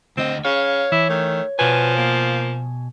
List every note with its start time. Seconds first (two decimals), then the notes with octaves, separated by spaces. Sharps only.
0.17 D2 C4 D#5
0.45 C#3 C#5 F5
0.92 E3 E4
1.10 D#3 A3
1.59 B2 F3 B4 G#5
1.97 A#3